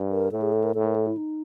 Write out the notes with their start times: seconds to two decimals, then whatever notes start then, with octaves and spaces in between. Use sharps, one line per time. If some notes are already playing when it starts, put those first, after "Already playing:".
Already playing: G2
0.10 A#4
0.31 A2 A4
0.42 G#4
0.53 A4
0.64 A#4
0.74 A2 A4
0.85 A#4
0.96 A4
1.07 E4
1.17 D#4